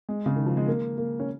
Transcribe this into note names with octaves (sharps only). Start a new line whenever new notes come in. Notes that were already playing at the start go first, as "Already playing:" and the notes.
G#3
C#3
D#3
F3
G#3
A#3
A#3
C#4